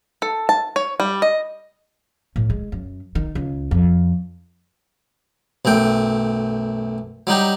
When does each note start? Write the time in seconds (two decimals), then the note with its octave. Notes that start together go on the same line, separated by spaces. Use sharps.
0.22 A4
0.49 A5
0.76 C#5
1.00 G3
1.22 D#5
2.36 A2
2.50 G#3
2.72 F#2
3.15 D#3
3.35 C#2
3.71 F2
5.65 B1 F#2 A3 G5
7.27 F#3 G3 D#4 G4